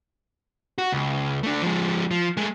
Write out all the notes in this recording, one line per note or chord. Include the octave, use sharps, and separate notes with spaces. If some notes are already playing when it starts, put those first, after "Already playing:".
F#4
C#2
A3 D4
F3 G#3
F3
G#3 A3